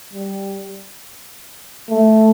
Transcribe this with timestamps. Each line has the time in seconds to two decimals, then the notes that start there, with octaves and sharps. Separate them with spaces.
0.13 G3
1.90 A3